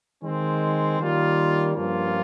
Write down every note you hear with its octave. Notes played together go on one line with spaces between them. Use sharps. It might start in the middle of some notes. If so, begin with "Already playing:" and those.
D#3 G#3 C4
D#3 G3 A#3 F4
G2 F3 A#3 C#4 F4